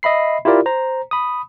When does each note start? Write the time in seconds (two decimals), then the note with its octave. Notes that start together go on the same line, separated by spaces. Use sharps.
0.03 D#5 E5 B5 C7
0.45 E4 F4 G4 A#4 D5
0.66 C5 A#5
1.11 B5 D#6